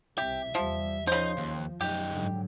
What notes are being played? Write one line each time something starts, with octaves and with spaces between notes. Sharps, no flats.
C2 C3 G4 E5
E2 F3 G3 E5
C#3 F3 D#4 C5
D#2
F#2 D#4 G4
G#2 D3 F#3